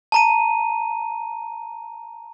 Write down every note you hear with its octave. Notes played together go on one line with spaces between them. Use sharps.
A5 A#5 D#7